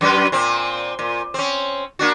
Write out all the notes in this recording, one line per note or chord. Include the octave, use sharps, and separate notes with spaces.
F#2 F#3 B4
A#2 C4
A#2
C4 C#4
A#3 D4 F#4